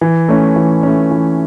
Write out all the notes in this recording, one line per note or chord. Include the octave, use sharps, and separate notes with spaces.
E3
A3 C#4
E3
A3 C#4
E3